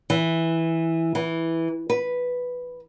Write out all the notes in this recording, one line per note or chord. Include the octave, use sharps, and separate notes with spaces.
E3
E3
B4